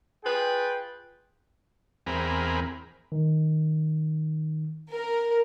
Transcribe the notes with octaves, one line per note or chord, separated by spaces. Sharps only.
F4 G#4 B4 G5
E2 C4 G#4 A#4 B5
D#3
A#4